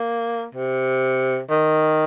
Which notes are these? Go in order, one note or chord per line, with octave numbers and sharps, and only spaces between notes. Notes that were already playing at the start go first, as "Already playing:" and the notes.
Already playing: A#3
C3
D#3